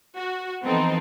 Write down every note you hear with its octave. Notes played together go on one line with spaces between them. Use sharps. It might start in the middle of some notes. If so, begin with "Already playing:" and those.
F#4
E3 F3 B3 C4 D#4 A4